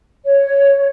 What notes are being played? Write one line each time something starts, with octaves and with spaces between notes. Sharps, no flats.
C#5